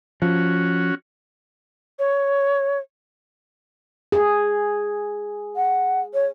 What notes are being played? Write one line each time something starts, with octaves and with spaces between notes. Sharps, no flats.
F3 C#4 F#4
C#5
G#4
F#5
C#5